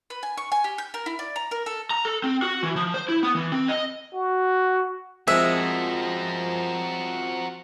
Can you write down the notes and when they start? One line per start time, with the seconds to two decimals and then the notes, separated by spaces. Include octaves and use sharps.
0.10 B4
0.23 G#5
0.37 C#6
0.52 G#5
0.64 G4
0.78 G6
0.94 A#4
1.06 E4
1.19 D5
1.36 A#5
1.51 A#4
1.66 A4
1.91 A#5
2.05 A4
2.24 C4
2.42 F#4
2.63 E3
2.76 F3
2.94 C5
3.09 E4
3.23 B3
3.35 E3
3.52 C4
3.69 D#5
4.14 F#4
5.28 F3 G#3 C4 F#4 A#4 E5